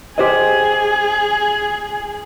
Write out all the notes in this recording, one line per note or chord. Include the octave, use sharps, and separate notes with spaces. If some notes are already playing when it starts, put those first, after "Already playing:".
G4 G#4 C5 D#5